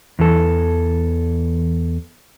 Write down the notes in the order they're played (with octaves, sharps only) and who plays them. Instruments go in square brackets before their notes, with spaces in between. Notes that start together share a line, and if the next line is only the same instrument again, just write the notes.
[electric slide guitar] E2 E3 A4